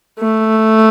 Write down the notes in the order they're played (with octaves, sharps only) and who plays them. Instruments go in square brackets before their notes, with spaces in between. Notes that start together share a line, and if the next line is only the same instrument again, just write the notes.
[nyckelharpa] A3